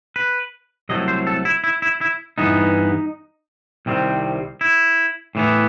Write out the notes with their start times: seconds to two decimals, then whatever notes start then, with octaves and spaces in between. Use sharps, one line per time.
0.16 B4
0.89 C2 C3 F#3 A3 D#5
1.08 C5
1.27 A4
1.45 E4
1.64 E4
1.82 E4
2.01 E4
2.38 G2 E3 B3 D#4
3.86 C2 C3 D#3 G3 C4
4.61 E4
5.35 A2 E3 B3